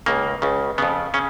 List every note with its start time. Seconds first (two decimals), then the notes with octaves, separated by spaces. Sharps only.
0.06 C#2 C#3 A#3
0.42 C#2 C#3
0.78 F2 C#3 B3
1.14 C#3 C#4